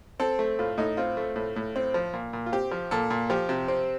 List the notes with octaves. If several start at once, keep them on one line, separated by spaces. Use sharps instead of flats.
C4 A4
A3
A2 F4
A2 D#4
C4 F4
A3
A2
A2
C4
F3
A#2
A#2
F4
C4 G4
F3
A#2 A4
A#2
F3 G4
C3
C4